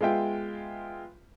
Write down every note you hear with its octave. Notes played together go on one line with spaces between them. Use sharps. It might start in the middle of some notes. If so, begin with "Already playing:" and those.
G#3 B3 F4 E5 G5